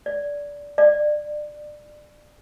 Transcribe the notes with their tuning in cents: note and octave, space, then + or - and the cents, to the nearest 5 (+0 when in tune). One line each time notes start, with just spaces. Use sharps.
D5 -15
D5 +25